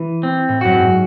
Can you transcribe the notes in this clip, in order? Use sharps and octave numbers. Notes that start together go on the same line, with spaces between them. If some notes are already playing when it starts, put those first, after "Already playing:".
Already playing: E3
C4
A2
F#2 F#4
G#2